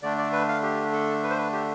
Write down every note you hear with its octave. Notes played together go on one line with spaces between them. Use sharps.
D3 A3 D4 D5
D5
B4
F5
G4
A4
B4
C5
B4
G4